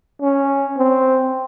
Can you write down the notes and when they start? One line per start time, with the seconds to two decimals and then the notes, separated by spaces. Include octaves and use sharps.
0.22 C#4
0.78 C4